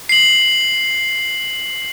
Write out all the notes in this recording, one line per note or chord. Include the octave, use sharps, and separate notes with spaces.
C7 F#7